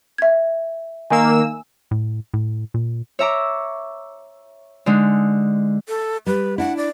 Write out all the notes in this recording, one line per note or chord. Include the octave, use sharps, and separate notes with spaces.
E5 G#6
D#3 A#3 G#5 E6
A2
A2
A#2
C#5 E5 A#5 D6
D3 G#3 D#4
A4
G3 B4
D4 E4 F#5
D5